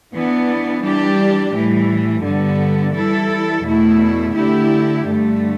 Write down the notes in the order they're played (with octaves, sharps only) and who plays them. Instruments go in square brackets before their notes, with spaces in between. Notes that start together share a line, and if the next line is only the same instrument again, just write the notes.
[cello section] E3 B3 D4
E3 G3 D4 G4
A2 E3 G3
G2 D3 G3 B3
E3 G3 E4 A4
E2 B2 A3 E4
D3 A3 E4 G4
G2 D3 A3